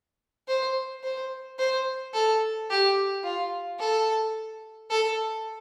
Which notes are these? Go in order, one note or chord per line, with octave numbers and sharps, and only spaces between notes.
C5
C5
C5
A4
G4
F4
A4
A4